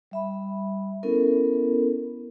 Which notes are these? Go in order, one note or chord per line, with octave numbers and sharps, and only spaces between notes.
G3 E5 B5
B3 C#4 E4 A4 A#4